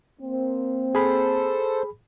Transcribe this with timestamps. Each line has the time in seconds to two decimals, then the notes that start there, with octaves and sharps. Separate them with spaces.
0.20 A#3 C4
0.95 G#4 A4 C5 B5